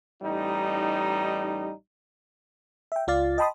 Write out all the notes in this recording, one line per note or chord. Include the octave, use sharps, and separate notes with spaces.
A1 G3 D#4
E5 G5
C#2 F4 D5 F5 A6
D#5 G5 A5 B5 C6 D#6